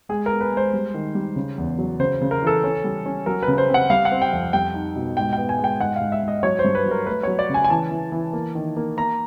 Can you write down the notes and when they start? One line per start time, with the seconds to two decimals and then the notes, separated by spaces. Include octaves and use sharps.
0.09 G#3 G#4
0.26 B3 A#4
0.41 B4
0.52 G#3
0.57 C5
0.73 G3
0.94 D#3
1.15 G3
1.36 C#3
1.58 E2
1.79 F#3
2.00 C#3 C5
2.22 C#3
2.31 A#4
2.43 E3 A4
2.64 C#4
2.84 G3
3.06 C#4
3.26 F#3 A#4
3.43 B4
3.48 C#3
3.58 C5
3.69 C4 F#5
3.90 G3 F5
4.05 F#5
4.11 C4
4.22 G5
4.33 F2
4.53 G3 G5
4.74 D#4
4.96 B2
5.17 G#2 G5
5.33 G5
5.38 B3
5.49 G#5
5.59 G#3
5.64 G5
5.80 G#2 F#5
5.96 F5
6.01 G#2
6.12 E5
6.23 G#2 D#5
6.43 F#3 C#5
6.59 C5
6.64 G2
6.75 B4
6.86 F#3
6.91 A#4
7.06 A3 B4
7.23 F#3 C#5
7.39 D5
7.50 C#3 G#5
7.64 G#5
7.70 E3 A5
7.91 E3
8.12 E3
8.33 A#3
8.55 D#3
8.77 A#3
8.97 A#3 A#5